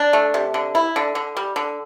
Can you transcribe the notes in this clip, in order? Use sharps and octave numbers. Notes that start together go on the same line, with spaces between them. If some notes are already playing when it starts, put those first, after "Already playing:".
Already playing: D4
A3
C3
D3
E4
D3
D3
G3
D3